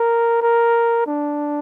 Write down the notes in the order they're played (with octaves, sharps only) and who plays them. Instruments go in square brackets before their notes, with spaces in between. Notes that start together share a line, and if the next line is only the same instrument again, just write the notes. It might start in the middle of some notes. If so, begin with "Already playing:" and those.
Already playing: [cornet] A#4
A#4
D4